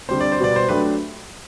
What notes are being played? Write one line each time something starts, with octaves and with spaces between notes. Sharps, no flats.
D3 G3 C4 C5
D5
C5
B2 G3 B3 F#4 D5
C5
F#3 A3 D4 G4 B4